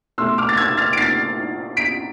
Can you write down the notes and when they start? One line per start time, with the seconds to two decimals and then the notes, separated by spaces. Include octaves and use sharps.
0.18 B2 A3 C6 E6
0.38 D6 F6
0.49 A6
0.57 E6 G#6
0.77 F6 A6
0.93 D7
0.97 A6 C7
1.77 B6 D7